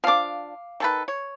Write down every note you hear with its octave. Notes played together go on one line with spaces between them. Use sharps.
F3 D4 F5 D6
D#3 A4 B4
C#5